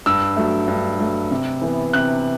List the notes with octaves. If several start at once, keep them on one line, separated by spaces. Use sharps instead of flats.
G2 E6
F#3 A3
G2
F#3 A3
C3
E3 B3
C3 F#6